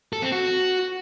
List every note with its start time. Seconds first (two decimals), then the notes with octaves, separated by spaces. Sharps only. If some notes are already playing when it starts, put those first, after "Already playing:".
0.13 A4
0.22 C4
0.32 F#4